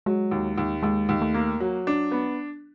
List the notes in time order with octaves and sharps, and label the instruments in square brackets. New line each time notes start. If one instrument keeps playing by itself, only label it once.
[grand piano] F#3 [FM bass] G#3
[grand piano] D#2
D#2
[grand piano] D#2 [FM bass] G#3
[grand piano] D#2
[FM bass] A3
[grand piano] A#3
F#3
D4
B3